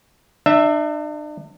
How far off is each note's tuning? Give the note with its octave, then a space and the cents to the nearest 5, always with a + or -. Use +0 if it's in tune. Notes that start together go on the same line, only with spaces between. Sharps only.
D4 +40 E5 +0